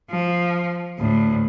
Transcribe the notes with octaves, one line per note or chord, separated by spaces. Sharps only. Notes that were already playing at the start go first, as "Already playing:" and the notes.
F3
D2 A2